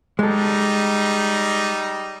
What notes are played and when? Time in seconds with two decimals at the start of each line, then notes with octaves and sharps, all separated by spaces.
0.19 G3 G#3 D#4 A4